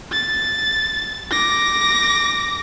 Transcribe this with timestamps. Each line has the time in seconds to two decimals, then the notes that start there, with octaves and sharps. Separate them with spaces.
0.12 A6
1.31 D6 A#6